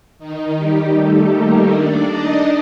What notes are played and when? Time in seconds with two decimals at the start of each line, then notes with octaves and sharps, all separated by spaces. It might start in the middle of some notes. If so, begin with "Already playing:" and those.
0.19 D#3 D#4
0.57 G3 G4
0.95 A3 A4
1.33 A#3 A#4
1.71 D4 D5
2.09 D#4 D#5